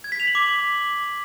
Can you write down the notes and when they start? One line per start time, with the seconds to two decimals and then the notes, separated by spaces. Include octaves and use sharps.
0.04 G#6
0.12 B6
0.20 F7
0.27 F#7
0.35 D6